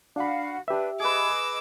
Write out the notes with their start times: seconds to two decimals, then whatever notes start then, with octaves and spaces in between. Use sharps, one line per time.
0.16 D4 F#4 F5 F#5 B5
0.68 D4 G4 B4 E5
1.00 G#4 B4 D#5 D6 E6